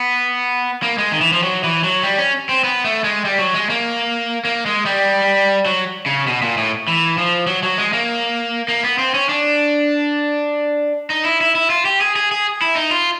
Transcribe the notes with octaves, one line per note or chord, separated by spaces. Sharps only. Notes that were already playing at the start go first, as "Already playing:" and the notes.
Already playing: B3
A#3
G#3
D#3
E3
F3
F#3
E3
F#3
G3
C#4
C4
B3
A3
G#3
G3
F#3
G#3
A#3
A#3
G#3
G3
F#3
C#3
B2
A#2
A2
E3
F3
F#3
F#3
G#3
A#3
A#3
B3
C4
C#4
D4
D#4
E4
E4
E4
F4
G4
G#4
G#4
G#4
E4
D#4
F4